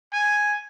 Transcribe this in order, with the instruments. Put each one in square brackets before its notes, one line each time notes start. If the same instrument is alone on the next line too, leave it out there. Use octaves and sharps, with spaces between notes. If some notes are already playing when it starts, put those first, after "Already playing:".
[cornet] G#5